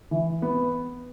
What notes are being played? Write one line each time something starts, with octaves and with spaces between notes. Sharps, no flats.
E3
B3